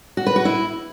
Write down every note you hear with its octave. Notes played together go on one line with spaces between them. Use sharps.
F#4
B4
F#4
E4